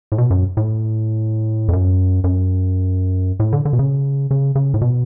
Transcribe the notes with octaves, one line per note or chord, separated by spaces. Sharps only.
A2
B2
F#2
A2
F2
F#2
F#2
A2
D3
D3
B2
C#3
C#3
C#3
A2
B2